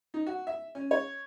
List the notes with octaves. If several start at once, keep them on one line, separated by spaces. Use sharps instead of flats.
D#4
F#4
E5
C#4
C#5